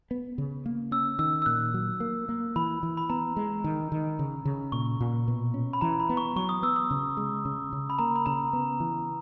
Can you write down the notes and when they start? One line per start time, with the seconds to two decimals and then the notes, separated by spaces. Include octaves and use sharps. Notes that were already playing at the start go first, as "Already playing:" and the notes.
0.11 B3
0.38 C#3
0.66 A#3
0.92 C#4 E6
1.19 D#3 E6
1.42 E6
1.46 A#2 F#6
1.74 F#3
2.00 A#3
2.29 A#3
2.56 E3 B5
2.83 E3
2.97 B5
3.10 B3 A#5
3.36 G#3
3.64 D#3
3.92 D#3
4.19 C#3
4.45 C#3
4.72 A#2 C#6
5.00 A#2
5.28 B2
5.54 C#4
5.73 B5
5.81 E3 A#5
6.00 B5
6.09 B3
6.17 C#6
6.36 F#3 C#6
6.49 D#6
6.63 B3 E6
6.76 D#6
6.91 C#3
7.17 G#3
7.45 C#3
7.73 C#3
7.90 B5
7.99 A#3 A#5
8.16 B5
8.26 C#3 A#5
8.53 B3
8.80 E3